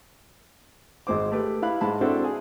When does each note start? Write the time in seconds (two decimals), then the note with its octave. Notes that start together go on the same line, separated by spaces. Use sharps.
1.07 G#1 G#3 C5 D6
1.32 A3 G4 B4
1.62 E4 G4 F5 B5 F#6
1.81 G#2 G#3 A5 B5
2.01 C4 D4 E4 F#4 A4 E5
2.24 G#4 G#5